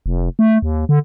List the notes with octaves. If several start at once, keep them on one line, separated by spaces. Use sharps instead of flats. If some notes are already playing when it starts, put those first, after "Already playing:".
F1
A3
D#2
D3